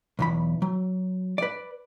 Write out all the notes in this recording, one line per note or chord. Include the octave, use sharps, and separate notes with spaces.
B1 E2 B5
F#3
B4 D5